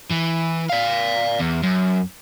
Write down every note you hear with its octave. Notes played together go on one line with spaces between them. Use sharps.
E3
D5 F5
E2
F#2